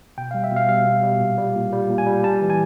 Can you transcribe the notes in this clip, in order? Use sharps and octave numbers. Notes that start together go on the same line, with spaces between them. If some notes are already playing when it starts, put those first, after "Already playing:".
B2 G5
G3 F5
E5
B2 F5
G3 F5
B2
G3
A#2
G3
A#2
G3
A#2
G#5
G3
G3 A5
E3
G#5